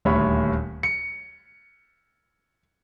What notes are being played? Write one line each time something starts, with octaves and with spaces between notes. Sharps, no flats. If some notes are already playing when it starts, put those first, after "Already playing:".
D#1 D2 C#5 B5
C#7